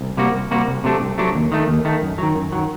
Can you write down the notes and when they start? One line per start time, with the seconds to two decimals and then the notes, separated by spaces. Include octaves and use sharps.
0.01 C2
0.17 C3 G3 A#3 F#4
0.34 C2
0.51 C3 G3 A#3 F#4
0.68 C2
0.84 C3 F#3 A3 D4
1.02 C2
1.18 C3 F#3 A3 D4
1.35 D#2
1.52 D#3 A3
1.68 D#2
1.85 D#3 A3
2.02 F#2
2.18 D#3 F#3
2.35 F#2
2.52 D#3 F#3